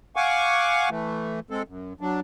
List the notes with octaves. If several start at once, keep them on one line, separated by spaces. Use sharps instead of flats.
F5 F#5 G#5 C#6 D6
E3 A3
G#3 C4 A4
F#2
F#3 D4